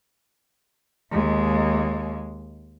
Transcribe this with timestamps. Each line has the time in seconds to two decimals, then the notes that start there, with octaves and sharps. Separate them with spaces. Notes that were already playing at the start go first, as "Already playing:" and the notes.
1.11 D#2 G#3